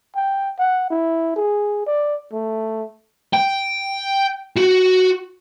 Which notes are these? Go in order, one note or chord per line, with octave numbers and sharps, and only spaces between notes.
G5
F#5
E4
G#4
D5
A3
G5
F#4